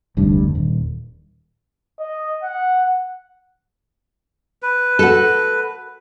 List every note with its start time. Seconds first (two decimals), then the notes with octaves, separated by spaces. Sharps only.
0.17 F1 D2 G2
0.55 D#1
1.99 D#5
2.44 F#5
4.62 B4
4.99 F#4 A4